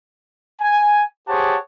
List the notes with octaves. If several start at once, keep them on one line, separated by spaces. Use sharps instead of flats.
G#5
G4 G#4 C5 C#5 F#5 A5